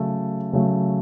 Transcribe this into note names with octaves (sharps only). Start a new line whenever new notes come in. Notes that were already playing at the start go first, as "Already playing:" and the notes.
Already playing: C#3 F#3 A3
C#3 F#3 A3